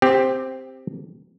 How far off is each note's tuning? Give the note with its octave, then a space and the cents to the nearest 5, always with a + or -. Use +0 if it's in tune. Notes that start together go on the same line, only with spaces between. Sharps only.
C4 +0 G4 +10